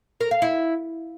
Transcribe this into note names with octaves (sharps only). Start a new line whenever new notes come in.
A#4
F5
E4